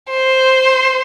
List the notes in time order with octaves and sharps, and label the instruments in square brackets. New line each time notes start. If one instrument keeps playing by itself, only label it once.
[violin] C5